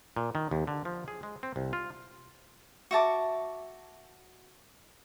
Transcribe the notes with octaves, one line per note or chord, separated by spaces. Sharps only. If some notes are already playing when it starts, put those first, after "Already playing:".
A#2
D#3
D#2
D3
F3
G#4
G#3
C4
C2
F4
F#4 E5 A5 D6